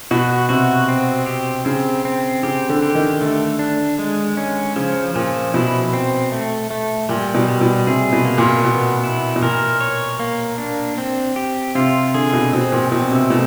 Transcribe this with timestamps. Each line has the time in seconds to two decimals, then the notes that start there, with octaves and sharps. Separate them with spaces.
0.11 B2 F#4
0.49 C3 F#4
0.88 C4
1.26 G4
1.65 C#3 C4
2.05 C4
2.43 C#3 G4
2.69 D3
2.82 G4
2.95 D#3
3.21 D3 A3
3.59 D4
3.99 G#3
4.37 C#4
4.76 C#3 F3
5.14 A#2 F3
5.54 B2 E4
5.93 C4
6.32 A3
6.71 A3
7.09 A#2 G3
7.34 B2
7.49 G3
7.61 B2
7.87 C3 G#4
8.13 B2
8.25 A#3
8.38 A#2
8.64 B2 B3
9.04 E4
9.36 B2
9.42 A#2 A#4
9.81 C#5
10.20 A#3
10.58 D4
10.98 C4
11.36 G4
11.75 C3 F4
12.14 D3 G#4
12.33 B2
12.53 B2 C4
12.72 A#2
12.92 B2 C4
13.11 C3
13.30 B2 A3